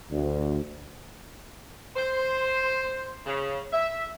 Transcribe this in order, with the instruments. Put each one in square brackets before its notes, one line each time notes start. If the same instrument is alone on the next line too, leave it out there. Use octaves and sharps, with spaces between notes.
[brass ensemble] D2
[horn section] C5
C#3
E5